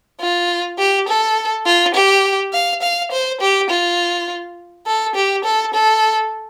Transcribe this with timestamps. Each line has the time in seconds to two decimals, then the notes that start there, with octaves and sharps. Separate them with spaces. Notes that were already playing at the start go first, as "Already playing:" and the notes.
0.20 F4
0.78 G4
1.08 A4
1.66 F4
1.95 G4
2.53 F5
2.82 F5
3.11 C5
3.41 G4
3.70 F4
4.86 A4
5.15 G4
5.44 A4
5.74 A4